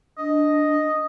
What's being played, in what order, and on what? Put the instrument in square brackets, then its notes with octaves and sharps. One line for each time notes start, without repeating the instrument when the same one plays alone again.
[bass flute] D4 [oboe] D#5